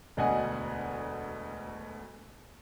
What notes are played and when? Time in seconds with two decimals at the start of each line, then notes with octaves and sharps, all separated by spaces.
0.17 E1 D2 B2 D#5 F#5 G#5